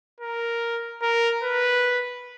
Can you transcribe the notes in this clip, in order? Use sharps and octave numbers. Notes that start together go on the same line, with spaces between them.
A#4
A#4
B4